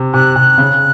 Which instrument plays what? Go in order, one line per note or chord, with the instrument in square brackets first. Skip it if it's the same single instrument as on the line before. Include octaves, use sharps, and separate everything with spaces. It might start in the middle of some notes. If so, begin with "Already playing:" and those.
Already playing: [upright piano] C3
[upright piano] C3 [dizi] F#6
[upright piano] C3
C#3